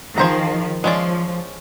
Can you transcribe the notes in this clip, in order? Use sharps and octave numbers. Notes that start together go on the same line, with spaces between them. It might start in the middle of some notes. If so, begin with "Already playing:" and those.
D#3 F3 G#4 C5 A#5
F3 G#3 C#4 D5